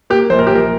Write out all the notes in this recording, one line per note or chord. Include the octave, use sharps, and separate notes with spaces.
A#3 G4
A#1 C5
A#4
G4
A#1
A#4